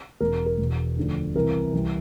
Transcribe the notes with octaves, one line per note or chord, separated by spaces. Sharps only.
E1 E2 B2 A#4
A#4
E1 E2 B2
D2 D3 F3
C2 C3 E3 A#4
C2 C3 E3